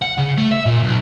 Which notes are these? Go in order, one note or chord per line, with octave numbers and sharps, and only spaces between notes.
F#5
C#3
A3
E5
A#2
B1